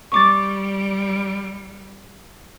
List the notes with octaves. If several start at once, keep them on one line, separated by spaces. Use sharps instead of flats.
G3 C#6 D6 A6